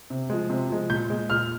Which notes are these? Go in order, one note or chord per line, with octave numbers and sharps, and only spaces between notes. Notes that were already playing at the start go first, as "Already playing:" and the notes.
C3
F3 G#3
C3
F3 G#3
A#2 G6
G#3
A#2 F6